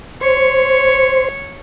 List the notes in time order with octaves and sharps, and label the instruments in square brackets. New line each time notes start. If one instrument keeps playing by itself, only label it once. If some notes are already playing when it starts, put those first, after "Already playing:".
[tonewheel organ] C5 [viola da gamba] C#5